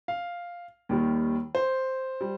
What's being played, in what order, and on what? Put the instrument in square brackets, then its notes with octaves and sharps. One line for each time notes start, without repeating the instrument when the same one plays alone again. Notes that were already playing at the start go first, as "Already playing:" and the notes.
[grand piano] F5
D#2 D#3 G3
C5
G3